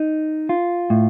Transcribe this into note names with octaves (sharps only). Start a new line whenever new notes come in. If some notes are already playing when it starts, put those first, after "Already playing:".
Already playing: D#4
F4
A2